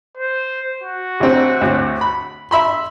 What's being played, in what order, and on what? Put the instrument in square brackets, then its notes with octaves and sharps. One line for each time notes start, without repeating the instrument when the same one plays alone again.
[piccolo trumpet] C5
F#4
[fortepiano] A1 C4
D2 A2 C4
B5
E5 B5 C6